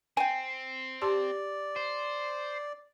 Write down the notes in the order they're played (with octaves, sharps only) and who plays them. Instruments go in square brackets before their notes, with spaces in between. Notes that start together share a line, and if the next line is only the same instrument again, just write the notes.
[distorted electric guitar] C4 [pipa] G5 G#5
[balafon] G4 A5 C6 [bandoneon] D5
[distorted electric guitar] C5